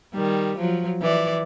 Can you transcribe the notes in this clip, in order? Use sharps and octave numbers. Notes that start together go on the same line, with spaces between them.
D#3 G3
F3 F#3
E3 D5